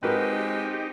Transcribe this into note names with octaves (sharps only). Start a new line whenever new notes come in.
G#3 C4 D#4 F#4 G4 A#4 B4